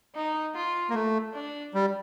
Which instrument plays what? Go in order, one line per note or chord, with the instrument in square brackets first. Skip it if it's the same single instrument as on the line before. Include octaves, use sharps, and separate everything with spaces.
[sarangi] D#4
F4
[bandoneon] A#3
A3
[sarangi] D4
[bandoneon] G3